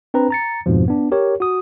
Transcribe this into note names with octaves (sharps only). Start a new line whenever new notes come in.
C4 D4 B4 A#5
A#5 A6 C#7
F2 G#2 B2 F3
B3 D4
G4 A#4 C#5
F#4 D#6